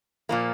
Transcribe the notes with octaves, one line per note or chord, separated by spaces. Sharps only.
A#2 F3 A#3